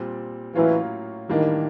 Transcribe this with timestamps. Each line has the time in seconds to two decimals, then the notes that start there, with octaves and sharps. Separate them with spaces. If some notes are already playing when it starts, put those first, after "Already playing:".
Already playing: A#2 G3 C4
0.54 A2 E3 F#3 A#3 C#4 F4
1.29 A2 D#3 E3 G3 A#3 D4